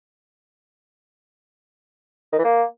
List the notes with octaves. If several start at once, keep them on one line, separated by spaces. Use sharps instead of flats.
D#3
E3
A#3